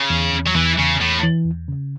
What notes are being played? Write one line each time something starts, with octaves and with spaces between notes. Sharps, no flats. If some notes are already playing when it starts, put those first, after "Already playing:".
Already playing: C#3
E2
E2
F#3
E2 E3
E2 C#3
E2 A2
E3
E2
C#3